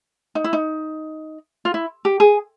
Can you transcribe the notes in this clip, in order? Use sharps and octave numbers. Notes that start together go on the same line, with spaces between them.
D#4
E4
D#4
F4
E4
G4
G#4